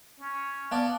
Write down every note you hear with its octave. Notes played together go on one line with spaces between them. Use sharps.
C#4
B3 D5 F5 A5